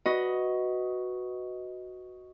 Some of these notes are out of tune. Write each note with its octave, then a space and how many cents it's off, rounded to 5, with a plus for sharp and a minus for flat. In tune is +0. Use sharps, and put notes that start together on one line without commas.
F#4 +0 B4 +0 D#5 +10